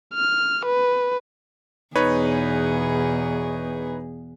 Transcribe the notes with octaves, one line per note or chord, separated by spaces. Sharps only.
F6
B4
E2 B2 D#4 G#4 B4 C#5